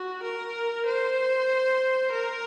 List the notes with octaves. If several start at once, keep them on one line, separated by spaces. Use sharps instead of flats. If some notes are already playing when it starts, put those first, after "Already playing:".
Already playing: F#4
A#4
C5
A#4